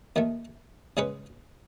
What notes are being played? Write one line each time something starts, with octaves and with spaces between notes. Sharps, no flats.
D#2 D#3 A3
C#3 G#3 C#4 G#4 B4